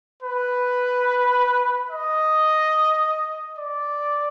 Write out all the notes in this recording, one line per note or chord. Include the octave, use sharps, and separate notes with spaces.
B4
D#5
D5